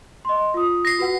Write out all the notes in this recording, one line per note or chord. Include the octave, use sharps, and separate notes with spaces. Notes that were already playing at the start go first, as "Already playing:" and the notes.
D#5 C6
F4 D#6
A#6 C7
F#4 B4 F#5